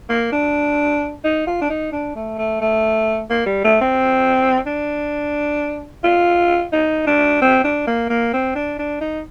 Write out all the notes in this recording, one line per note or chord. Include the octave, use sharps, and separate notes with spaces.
A#3
D4
D#4
F4
D4
D#4
D4
A3
A3
A3
A#3
G3
A3
C4
D4
F4
D#4
D4
C4
D4
A#3
A#3
C4
D4
D4
D#4